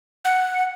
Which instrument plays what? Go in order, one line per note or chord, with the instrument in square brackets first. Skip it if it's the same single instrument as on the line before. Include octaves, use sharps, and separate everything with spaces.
[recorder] F#5